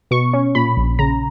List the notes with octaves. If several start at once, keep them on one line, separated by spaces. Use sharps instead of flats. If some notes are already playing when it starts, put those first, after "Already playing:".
B2 C#6
C#4
A#2 B5
A#1
C#3 A#5